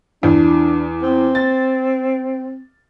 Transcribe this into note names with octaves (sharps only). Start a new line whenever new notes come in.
E2 D4
C4
A6